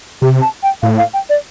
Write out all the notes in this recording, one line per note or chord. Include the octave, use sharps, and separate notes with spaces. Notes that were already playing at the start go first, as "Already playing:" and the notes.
C3 G4
A5
G5
A2 F5
F5
G5
D5